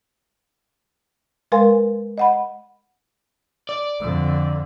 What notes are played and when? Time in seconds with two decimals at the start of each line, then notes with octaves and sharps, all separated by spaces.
1.52 G#3 A#4 B4 F5 G#5 C6
2.18 D#5 F#5 B5
3.69 D5
4.00 F2 D3